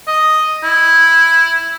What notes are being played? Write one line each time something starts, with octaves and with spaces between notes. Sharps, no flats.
D#5
E4